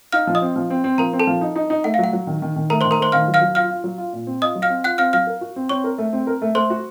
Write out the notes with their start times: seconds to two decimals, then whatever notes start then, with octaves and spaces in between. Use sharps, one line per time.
0.12 D#4 F5 F6
0.27 F3
0.35 D#5 D#6
0.42 C4
0.56 F3
0.70 C4
0.84 C4
0.98 F3 A#4 A#5
1.13 C4
1.20 A4 A5
1.27 F3
1.41 D#4
1.56 D#4
1.70 D#4
1.84 A3 F#5
1.94 F5
1.99 F#3 F#5
2.13 F#3
2.27 D#3
2.42 D#3
2.56 D#3
2.70 A3 A#4 A#5
2.81 D#3 C5 C6
2.91 A#4 A#5
2.99 A3 C5 C6
3.12 D#3 F5 F6
3.28 F#3
3.34 F5 F6
3.41 F#3
3.55 F4 F5 F6
3.71 F4
3.84 F#3
3.98 F4
4.13 A#2
4.27 C4
4.42 F4 D#5 D#6
4.55 F#3
4.62 F5 F6
4.70 C4
4.84 F4 F#5 F#6
4.98 C4 F5 F6
5.13 F#3 F5 F6
5.27 A#4
5.41 F#4
5.56 C4
5.69 C4 C#5 C#6
5.84 A#4
5.98 A3
6.13 C4
6.27 A#4
6.42 A3
6.55 A3 C5 C6
6.70 F#4